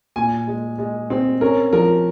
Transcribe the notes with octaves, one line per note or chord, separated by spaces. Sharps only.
A#2 G#5
G#3
G#3
C4
C#4 A#4
F3 A#4